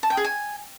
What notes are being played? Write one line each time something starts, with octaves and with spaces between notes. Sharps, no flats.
A5
G5
G#4
G#5